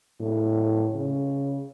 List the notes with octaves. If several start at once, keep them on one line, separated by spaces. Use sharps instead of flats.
A2
C#3